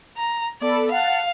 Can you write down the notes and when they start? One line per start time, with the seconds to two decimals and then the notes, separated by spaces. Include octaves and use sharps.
0.17 A#5
0.61 B3 A4 D5 B5
0.91 F5 F#5 A5